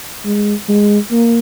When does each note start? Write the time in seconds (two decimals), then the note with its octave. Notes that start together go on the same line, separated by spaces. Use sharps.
0.25 G#3
0.69 G#3
1.11 A#3